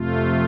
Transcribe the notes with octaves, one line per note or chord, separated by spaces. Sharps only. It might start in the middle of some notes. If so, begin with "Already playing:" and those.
Already playing: F2 C3 A3 F4